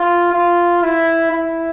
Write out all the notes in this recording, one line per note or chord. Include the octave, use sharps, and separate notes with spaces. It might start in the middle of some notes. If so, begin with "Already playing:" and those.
Already playing: F4
F4
E4
E4